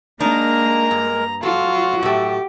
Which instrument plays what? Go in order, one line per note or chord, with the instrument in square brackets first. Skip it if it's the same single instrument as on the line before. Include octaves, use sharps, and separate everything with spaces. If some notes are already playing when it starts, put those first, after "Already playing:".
[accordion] G#3 A#4 [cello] A#3 [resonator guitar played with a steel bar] D4 D#4 [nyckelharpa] A#5
[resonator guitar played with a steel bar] G2
[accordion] F#3 [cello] F4 [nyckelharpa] F#4 [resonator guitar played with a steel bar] A4
[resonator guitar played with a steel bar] A2 A3 [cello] G4